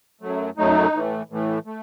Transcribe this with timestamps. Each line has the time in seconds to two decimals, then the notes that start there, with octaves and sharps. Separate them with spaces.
0.21 F#2 F#3 A3
0.57 F#2 F#3 A3 D#4
0.94 A2 E3 A3
1.30 A2 E3 A3
1.66 A3